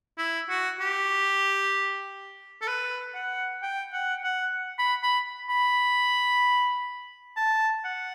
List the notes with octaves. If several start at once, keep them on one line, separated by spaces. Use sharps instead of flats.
E4
F#4
G4
A4
B4
F#5
G5
F#5
F#5
B5
B5
B5
A5
F#5